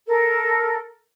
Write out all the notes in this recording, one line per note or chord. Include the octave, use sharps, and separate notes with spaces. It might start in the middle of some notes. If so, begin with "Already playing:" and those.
A4 A#4